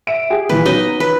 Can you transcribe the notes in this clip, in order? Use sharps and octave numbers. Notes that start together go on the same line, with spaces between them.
E5 D7
G4 G#4
A#2 E3 B4
F#3 B3 C#4 D#4 D#5
B4